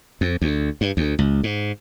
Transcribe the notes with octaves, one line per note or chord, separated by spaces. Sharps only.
F2
D2
G2
D2
C#2
G#2